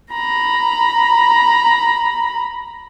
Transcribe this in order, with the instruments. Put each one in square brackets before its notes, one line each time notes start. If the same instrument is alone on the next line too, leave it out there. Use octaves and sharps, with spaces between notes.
[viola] A#5 B5